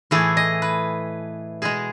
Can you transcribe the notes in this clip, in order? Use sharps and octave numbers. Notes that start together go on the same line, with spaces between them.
A2 E3 A3 G#4
D#5
B4
B2 G#3 G#4